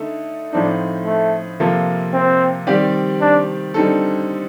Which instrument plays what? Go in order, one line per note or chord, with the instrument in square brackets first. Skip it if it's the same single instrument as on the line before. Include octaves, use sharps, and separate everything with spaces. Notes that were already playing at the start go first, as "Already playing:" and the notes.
Already playing: [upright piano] D3 A3 D#4 A4
[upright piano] A2 F3 C4 D#4 [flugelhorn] D4
[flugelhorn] A3
[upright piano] C3 F3 A#3 F4 A4
[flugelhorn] C4
[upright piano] D#3 G3 C4 G4 D5
[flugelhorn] D4
[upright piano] D3 G3 C4 D#4 A4